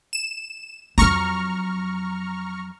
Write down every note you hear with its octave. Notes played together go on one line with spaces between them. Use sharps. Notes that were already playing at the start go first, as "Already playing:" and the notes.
E7
F2 F#3 A#5 C#6 F6